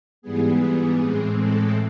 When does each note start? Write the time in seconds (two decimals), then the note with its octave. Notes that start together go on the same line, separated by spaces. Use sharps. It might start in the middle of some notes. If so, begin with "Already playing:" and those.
0.22 G#2 E3 G3 B3 G#4
0.99 A2 E3 G#3 C4
1.39 A4